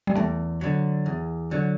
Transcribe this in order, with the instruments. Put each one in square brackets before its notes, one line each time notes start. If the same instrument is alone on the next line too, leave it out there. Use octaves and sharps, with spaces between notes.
[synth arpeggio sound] G3
[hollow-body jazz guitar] E2 [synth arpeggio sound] A3
[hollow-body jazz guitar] D3 F#3
E2
D3 F#3